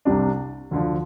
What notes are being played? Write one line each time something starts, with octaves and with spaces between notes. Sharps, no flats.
C2 C3 G3 D4
D2 D3 F3